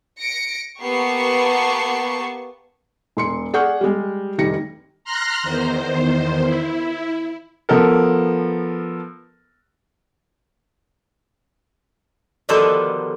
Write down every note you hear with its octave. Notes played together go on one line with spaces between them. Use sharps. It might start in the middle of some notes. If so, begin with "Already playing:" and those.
A#6 C#7 D7
A#3 B3 G4 A5 C#6 C7
E1 C6 C#7
G#4 D5 F#5 C#6 F6 G6
G3 G#3
F1 D#3 G3 A#6 C#7
A#5 C6 F6 F#6 A#6
E2 D#3 C5
E4
F3 B3 A4 A#4
B2 D3 D#3 F3 G3 A4